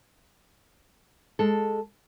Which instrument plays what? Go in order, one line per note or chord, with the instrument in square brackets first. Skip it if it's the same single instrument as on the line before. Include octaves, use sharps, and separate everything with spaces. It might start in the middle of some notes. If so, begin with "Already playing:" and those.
[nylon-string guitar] G#3 A4